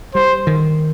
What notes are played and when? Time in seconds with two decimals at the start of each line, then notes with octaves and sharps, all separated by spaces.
0.15 G3 C5
0.47 D#3